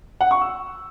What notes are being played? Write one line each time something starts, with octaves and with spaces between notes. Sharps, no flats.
F#5
C#6
E6